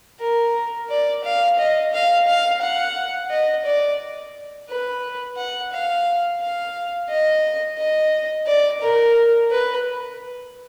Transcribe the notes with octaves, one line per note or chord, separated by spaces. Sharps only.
A#4
D5
F5
D#5
F5
F5
F#5
D#5
D5
B4
F#5
F5
F5
D#5
D#5
D5
A#4
B4